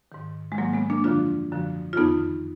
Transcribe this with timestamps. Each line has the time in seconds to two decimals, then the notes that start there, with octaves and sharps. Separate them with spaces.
0.12 G#2 D#3
0.52 G#3
0.58 G#2 D#3 F#3 A#3
0.73 G#3 B3
0.90 A#3 D4
1.04 F#2 D3 F3 D4 F4
1.52 F#2 D3 F3
1.93 F4
1.97 F2 D#3 B3 D#4